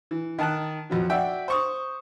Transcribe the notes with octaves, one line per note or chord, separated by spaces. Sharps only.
E3
D#3 A5 F#6
F2 B2 F#3
F#4 D5 E5 G5
C5 C#6 D#6